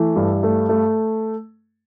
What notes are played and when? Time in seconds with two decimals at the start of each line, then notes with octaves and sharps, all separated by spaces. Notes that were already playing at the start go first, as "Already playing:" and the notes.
Already playing: E3 A3
0.16 G2
0.43 A3
0.69 A3